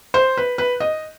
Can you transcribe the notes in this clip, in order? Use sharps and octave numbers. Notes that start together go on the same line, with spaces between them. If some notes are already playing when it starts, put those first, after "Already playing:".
C5
B4
B4
D#5